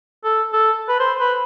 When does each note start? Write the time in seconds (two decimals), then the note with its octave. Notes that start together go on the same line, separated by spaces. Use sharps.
0.24 A4
0.53 A4
0.88 B4
1.00 C5
1.19 B4